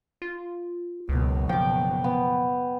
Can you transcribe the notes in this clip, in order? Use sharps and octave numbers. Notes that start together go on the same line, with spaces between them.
F4
F#1 C#2 B2
F3 G5 D6
B3